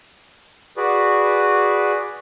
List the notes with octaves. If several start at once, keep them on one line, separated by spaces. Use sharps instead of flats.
F#4 G#4 B4 D5